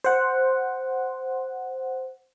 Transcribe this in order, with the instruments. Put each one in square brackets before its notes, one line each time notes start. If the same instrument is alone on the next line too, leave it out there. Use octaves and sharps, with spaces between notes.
[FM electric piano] C5 F#5